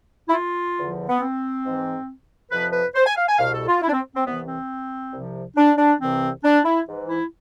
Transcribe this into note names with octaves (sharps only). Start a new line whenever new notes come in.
E4
F4
E2 D3 F3
B3
C4
G#2 E3
F2 C3 F3 B4
B4
C5
G#5
F5
G#5
C2 B2 F5
A4
F4
E4
D4
C4
C4
C2 C3 E3 B3
C4
C2 C3 F3
D4
D4
C2 C3 E3 C4
D4
E4
G#2 E3
E4